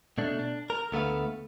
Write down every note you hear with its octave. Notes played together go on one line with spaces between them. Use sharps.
B2 A3 D4
D4
A#4
D2 A3 B3 F5